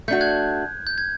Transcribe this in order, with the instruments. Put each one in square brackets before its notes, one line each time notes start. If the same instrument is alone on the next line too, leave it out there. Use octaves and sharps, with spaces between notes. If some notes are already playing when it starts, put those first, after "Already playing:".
[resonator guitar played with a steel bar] A3 D4 F#4 [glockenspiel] G6
[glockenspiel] F#6 G#6
G6
G#6